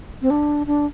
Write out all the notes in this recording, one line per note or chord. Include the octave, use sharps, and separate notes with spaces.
C4
D4
D4